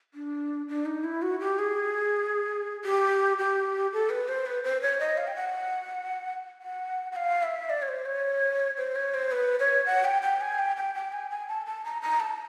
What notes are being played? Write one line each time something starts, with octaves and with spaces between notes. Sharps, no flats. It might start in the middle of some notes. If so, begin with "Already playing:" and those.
D4
D4
D#4
E4
F#4
G4
G#4
G4
G4
A4
B4
C5
B4
C5
C#5
D#5
F5
G5
F#5
F#5
F#5
F5
E5
D5
C#5
C5
C#5
C5
C#5
C5
B4
C#5
F#5
G5
G5
G#5
G5
G5
G5
G#5
G#5
A5
A5
A#5
A#5
A5